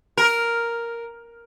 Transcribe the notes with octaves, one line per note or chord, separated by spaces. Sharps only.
A#4